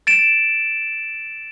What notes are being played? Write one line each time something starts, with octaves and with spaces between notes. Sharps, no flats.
A6 D7 E7